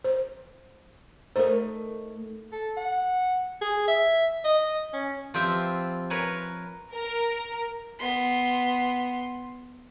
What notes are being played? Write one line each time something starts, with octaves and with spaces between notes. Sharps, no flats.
C5
A3 D#4 A#4 C5
A4
F#5
G#4
E5
D#5
C#4
F3 C4 F4 G4 B4 E5
A#4 B4 C#5 G#5
A#4
B3 C6